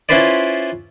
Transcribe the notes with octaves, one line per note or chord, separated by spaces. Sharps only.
C#4 E4 F4 B4 C5 D5